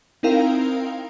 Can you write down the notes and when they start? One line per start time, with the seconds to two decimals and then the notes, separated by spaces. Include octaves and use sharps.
0.23 C4 D#4 E4 A#4 F5 G5